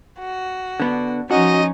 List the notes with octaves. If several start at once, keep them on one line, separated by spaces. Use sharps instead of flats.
F#4
D3 B3 D4
F3 C#4 D#4 F#4 D#5